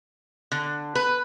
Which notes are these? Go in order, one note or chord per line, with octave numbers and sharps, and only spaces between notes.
D3
B4